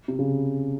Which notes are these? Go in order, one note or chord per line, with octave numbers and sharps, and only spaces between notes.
C3
C#3